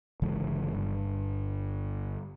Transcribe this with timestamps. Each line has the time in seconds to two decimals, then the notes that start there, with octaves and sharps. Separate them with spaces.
0.22 G1 C#3 E3 G#3
0.73 G1 G2